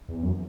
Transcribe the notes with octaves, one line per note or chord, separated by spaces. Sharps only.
E2
F#2